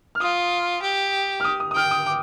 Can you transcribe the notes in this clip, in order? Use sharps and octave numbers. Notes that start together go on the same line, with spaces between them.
F6
F4 D#6
G4
F6
D#6
D#6
D#6
G5 F6
D#6
D6